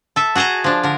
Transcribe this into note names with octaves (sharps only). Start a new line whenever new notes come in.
A4 E5
F#4 G#4 D#5 A5 A#5
F3 D4
D3 A#4